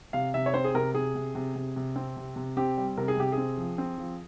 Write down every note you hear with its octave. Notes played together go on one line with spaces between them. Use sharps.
C3 F5
C3 E5
C#5
C4 C5
G#4
C3 A#4
C3 G#4
C3
C3
C3
C3
C4
C3
C3
C4 G4
G3
C3 A#4
G#4
C3 G4
G#4
C4
F3
C4
F3